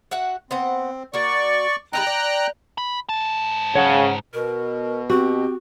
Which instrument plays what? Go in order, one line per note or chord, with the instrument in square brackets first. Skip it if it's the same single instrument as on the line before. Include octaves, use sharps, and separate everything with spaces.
[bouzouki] F#4 E5 F#5
[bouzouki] B3 C5 F#5 [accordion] C4
[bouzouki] A#3 F#4 [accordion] D5 C#6
[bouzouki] G3 C#4 D#4 [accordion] G5 A#5 F#6
[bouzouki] D5
[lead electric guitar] B5
G#2 A5
[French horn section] C#3 [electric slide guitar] C#5 F#5
[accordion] B2 [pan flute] A#4
[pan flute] C4 [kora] F#4 [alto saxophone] G4